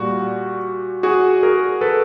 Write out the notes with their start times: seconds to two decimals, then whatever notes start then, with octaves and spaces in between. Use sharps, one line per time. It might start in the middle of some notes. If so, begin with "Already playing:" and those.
Already playing: A#2 G3 F#4
1.03 F#4 G#4
1.43 G#4 A#4
1.81 A4 B4